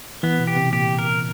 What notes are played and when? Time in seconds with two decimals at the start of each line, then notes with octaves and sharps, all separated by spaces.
0.23 E3 B3
0.40 B2
0.47 G4
0.56 C3
0.73 A#2 G4
0.99 A#4